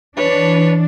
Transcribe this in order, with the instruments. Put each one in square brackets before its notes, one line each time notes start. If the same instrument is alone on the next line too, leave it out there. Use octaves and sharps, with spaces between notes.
[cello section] E3 D4 [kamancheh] B4 C#5